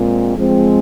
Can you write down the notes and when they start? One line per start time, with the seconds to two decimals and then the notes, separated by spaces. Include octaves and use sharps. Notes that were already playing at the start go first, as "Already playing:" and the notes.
Already playing: A#2 G#3 C4
0.36 F3 G#3 C4